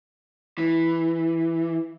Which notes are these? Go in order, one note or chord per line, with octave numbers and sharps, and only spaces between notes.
E3